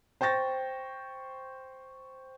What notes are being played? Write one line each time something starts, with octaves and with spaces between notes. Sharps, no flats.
C5 G5 C#6 A6 A#6